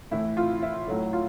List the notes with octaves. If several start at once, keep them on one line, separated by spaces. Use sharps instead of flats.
A2 E3 A3 E4
F4
E4
A2 F#3 A3
F4